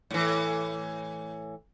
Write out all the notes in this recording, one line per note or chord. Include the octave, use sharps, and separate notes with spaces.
A2 E3